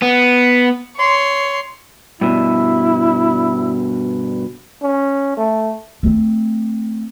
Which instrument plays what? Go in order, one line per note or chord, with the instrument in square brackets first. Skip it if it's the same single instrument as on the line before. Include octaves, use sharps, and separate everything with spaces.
[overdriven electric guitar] B3
[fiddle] C#5 C6
[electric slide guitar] G2 B2 [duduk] E4
[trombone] C#4
A3
[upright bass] A3 C4